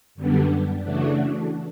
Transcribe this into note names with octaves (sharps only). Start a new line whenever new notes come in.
F#2 D3 G3 B3 D4
C#3 E3 A3 D4 F#4